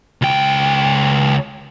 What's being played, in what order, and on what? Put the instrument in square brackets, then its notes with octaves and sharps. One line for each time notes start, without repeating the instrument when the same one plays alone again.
[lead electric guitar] C#2 G5